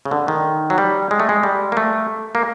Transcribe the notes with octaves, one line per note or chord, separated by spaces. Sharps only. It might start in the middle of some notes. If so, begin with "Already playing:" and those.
C#3
D3
D#3
F#3
G3
G#3
A3
G#3
G3
A#3
A3
A#3